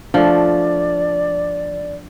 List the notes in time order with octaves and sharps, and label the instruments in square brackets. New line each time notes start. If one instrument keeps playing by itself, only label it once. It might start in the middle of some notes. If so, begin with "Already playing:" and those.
[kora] F3 A3 [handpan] D4 [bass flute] D5